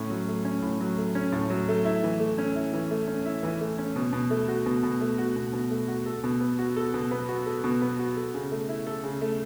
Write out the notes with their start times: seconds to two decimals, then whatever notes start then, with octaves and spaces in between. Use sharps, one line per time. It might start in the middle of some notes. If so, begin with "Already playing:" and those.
Already playing: A2 C#4
0.10 F#3
0.28 A3
0.45 C#4
0.62 A2
0.80 F#3
0.98 A3
1.15 C#4
1.32 A2
1.50 F#3
1.68 A3
1.85 E4
2.03 E3
2.20 A3
2.38 C#4
2.56 E4
2.73 E3
2.91 A3
3.08 C#4
3.26 E4
3.43 E3
3.61 A3
3.78 C#4
3.96 B2
4.13 B2
4.30 A3
4.48 F#4
4.66 B2
4.83 B2
5.01 A3
5.18 F#4
5.36 B2
5.53 B2
5.71 A3
5.88 F#4
6.06 A4
6.24 B2
6.40 B3
6.59 F#4
6.76 A4
6.94 B2
7.11 B3
7.28 F#4
7.46 A4
7.64 B2
7.82 B3
7.99 F#4
8.17 A4
8.34 C#3
8.51 A3
8.69 E4
8.87 A4
9.03 C#3
9.21 A3